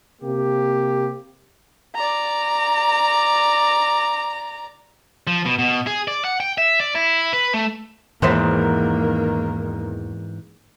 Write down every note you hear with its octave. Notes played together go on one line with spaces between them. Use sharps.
C3 A#3 G4
D5 A#5
F3
B2
B2
G#4
D5
F#5
G5
E5
D5
E4
B4
A3
E2 G#2 D#3 E3 A#3 C5 E5